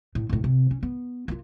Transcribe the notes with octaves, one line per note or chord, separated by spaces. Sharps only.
A2
C#2 A2
C3
C#4
B3
A#3 F4